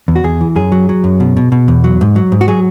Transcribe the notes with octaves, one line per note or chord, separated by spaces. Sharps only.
E2
F#4
E2 G#4
E3
F#2 G#4
F#3
F#3
F#2
B2
B2
B2
E2
F#3
G#2
F#3
G#2
F#4
F#3 G#4